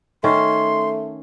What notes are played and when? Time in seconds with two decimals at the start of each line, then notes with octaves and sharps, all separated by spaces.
0.24 D#3 A3 C#4 C6